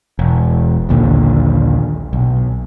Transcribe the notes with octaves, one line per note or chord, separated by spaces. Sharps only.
E1
A#1 D#2 A#2 D3
B1